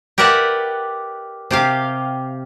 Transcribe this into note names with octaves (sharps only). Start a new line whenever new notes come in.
G4 A#4 B4 D5 E5 F#5
C3 G4 F5